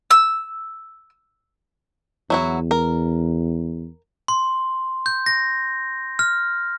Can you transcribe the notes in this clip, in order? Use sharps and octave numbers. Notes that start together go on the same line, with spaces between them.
E6
E2 F#3 E4 F#4
A#4
C6
G6
A#6
F6